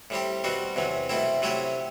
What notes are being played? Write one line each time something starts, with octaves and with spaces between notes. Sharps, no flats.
A2 G3 C4 G4
B2 G3 C4 F#4
E2 C3 F#3
C2 B2 A3 C4 E4
C3 F#3 A3 E4 G4